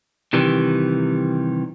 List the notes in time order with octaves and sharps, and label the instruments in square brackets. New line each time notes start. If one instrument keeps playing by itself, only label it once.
[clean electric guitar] C3 D#3 E3 G3